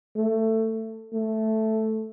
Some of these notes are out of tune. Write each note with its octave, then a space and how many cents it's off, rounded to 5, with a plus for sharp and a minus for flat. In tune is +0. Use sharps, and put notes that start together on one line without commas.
A3 +15
A3 +0